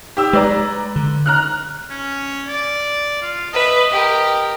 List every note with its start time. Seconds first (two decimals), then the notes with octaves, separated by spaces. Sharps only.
0.17 G4 E6
0.33 G#3 B4 D5 A#5
0.96 D3
1.26 A#5 F6 F#6
1.90 C#4
2.48 D5
3.22 F4
3.53 B4 D#5 E5
3.91 G4 A#4